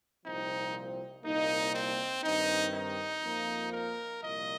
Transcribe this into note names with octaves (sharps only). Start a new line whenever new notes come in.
C2 A#2 F3 C4 D#4
C2 A#2 A#3 D#4
C4
G2 D#3 C4 D#4
D#4
F2 F3 A#3
A#4
C2 A#2 F3 A#3 D#5